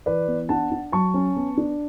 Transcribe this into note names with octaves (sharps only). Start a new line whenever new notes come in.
E3 B4 D5
B3
D4 F#5 A5
D4
F#3 A5 C#6
C#4
B3
D4